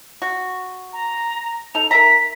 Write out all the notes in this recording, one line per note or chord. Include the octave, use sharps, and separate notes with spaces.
F#4
A#5
D#4 A4 F7
A#4 E5 A#5 B6